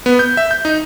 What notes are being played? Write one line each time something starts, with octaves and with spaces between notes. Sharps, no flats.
B3
G6
E5
G6
D#4